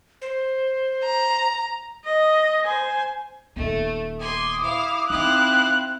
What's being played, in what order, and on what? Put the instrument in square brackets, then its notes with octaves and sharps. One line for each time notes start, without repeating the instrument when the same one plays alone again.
[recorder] C5
[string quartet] A#5
[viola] D#5
C5 G#5
[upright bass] D#1 B3 [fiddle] A3
[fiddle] G#5 C6 [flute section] D6 D#6
[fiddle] E4 F5
[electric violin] C4 F#6 [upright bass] D#4 [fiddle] E4 F5